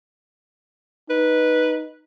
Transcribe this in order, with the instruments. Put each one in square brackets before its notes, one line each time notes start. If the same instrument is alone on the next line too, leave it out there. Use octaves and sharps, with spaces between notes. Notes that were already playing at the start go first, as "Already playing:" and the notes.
[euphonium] D#4 [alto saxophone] B4